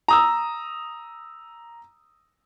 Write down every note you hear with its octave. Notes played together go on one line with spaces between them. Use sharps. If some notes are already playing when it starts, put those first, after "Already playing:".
A#5 D#6 E6